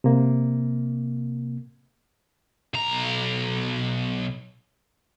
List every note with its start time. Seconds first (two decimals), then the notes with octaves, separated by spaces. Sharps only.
0.04 C3 A#3
2.74 B1 A#5